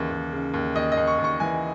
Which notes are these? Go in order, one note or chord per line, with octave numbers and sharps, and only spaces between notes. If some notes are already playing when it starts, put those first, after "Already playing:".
Already playing: D#2 C#3 E3
D#2
C#3
D#2
D#2 D#5
D#5
D#2
C#6
D#2
C#6
E3 G#5